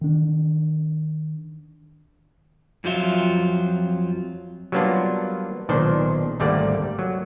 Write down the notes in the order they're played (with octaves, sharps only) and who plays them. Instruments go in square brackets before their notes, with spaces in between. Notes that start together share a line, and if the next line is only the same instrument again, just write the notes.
[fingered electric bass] D#3 D4
[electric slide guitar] F2 F3 F#3 F4 E5
[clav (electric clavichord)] F#3 G3 A#3 B3 D4 F4
B1 A#2 D#3 D4 C5
G#1 D2 G3 A3 A#3 D5
F#3